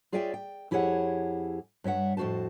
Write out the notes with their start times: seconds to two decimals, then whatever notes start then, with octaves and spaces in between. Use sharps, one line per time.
0.12 F4 G#4 C#5 D5 E5 G5
0.34 G5
0.71 F2 E4 G4 G#4 C#5 F#5
1.84 G2 C#5 E5 F#5
2.17 F2 A2 F#4 C5 A5